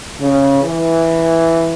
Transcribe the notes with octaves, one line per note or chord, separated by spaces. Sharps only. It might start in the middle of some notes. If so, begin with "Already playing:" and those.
C#3
E3